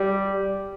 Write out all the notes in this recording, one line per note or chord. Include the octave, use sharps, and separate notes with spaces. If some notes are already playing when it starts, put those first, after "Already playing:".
Already playing: G3